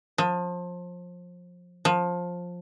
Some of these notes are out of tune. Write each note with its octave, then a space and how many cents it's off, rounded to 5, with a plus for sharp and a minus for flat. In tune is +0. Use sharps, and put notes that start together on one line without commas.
F3 +25
F3 +15